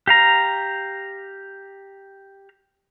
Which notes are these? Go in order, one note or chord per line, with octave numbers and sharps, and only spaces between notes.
G4 F5 A#5